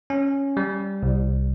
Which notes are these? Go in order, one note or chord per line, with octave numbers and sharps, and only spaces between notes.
C#4
G3
C2